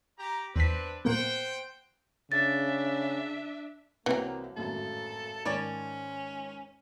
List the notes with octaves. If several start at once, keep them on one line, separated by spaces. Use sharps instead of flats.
G4 A#5
E2 C4 D4 B4 B6
A#2 A#3 B3 C5 F#5 G5
C#3 D4 E5 A6
C2 C3 E3 F#3 A#3 C4
G#1 F#2 A2 A4
G#2 D#3 C#4 C#5 D5 A5